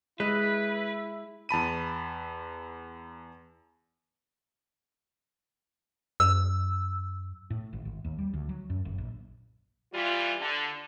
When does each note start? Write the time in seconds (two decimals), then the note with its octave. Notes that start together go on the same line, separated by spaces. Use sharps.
0.20 G#3 E4 B4
1.49 E2 A5 B5 D#7
6.20 F#2 E6
7.50 A2
7.73 G#1
7.85 G#1
8.04 D#2
8.18 G3
8.33 D2
8.49 F#3
8.70 F#2
8.85 F#1
8.98 A#1
9.93 E3 G3 F4
10.41 D3